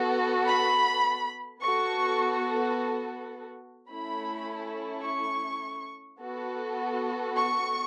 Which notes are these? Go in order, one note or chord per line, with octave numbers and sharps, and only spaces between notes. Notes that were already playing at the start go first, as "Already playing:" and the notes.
Already playing: B3 F#4 A4
B5
B3 F#4 A4 C#6
A3 C#4 E4 B5
C#6
B3 F#4 A4
C#6